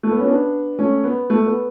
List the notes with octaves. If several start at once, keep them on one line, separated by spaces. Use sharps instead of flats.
A3
B3
C#4
B3 D4
A3 C#4
B3
A3
B3